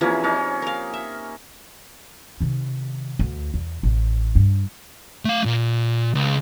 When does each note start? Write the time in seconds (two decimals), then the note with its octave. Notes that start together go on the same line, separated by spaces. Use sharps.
0.01 C3 E3 F3 A#3 C#4 G#4
0.24 C#4 D#4 F5
0.62 A#4 F5
0.93 E5
2.41 C3 D#3
3.19 D2
3.54 E2
3.83 A1
4.35 G2
5.25 A3 F5
5.45 A#2
6.15 C#2